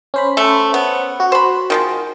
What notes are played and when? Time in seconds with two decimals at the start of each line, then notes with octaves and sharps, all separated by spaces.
0.14 C#4 C5 B5
0.37 A3
0.74 B3
1.20 F#4
1.32 C5 B5
1.70 D#3 F3 G#3